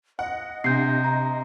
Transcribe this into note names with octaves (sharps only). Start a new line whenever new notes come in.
D#5 F#5
C3 D4 G6 C7
A#5